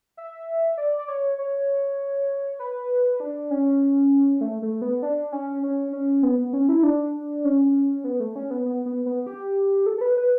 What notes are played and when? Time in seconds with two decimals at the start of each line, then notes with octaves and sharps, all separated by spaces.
0.17 E5
0.78 D5
0.98 D5
1.08 C#5
1.38 C#5
2.60 B4
3.20 D4
3.51 C#4
4.41 A3
4.62 A3
4.82 B3
5.02 D4
5.32 C#4
5.63 C#4
5.93 C#4
6.23 B3
6.38 B3
6.53 C#4
6.69 E4
6.83 D4
7.44 C#4
8.04 B3
8.20 A3
8.36 C#4
8.51 B3
8.65 B3
8.86 B3
9.06 B3
9.26 G4
9.86 A4
9.98 A4
10.01 B4
10.17 B4